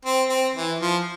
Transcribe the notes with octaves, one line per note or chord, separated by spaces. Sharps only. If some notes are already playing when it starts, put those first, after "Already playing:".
C4
C4
E3
F3